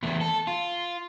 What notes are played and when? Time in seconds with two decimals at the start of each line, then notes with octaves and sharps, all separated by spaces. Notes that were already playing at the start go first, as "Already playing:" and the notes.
0.03 E2 A3
0.21 A4
0.47 F4